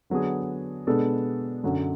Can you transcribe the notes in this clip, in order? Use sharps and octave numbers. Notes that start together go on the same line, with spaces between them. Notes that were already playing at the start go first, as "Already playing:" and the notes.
D3 F#3 B3 D4 G#4
B2 G#3 B3 D4 A4
F#2 D3 F#3 C#4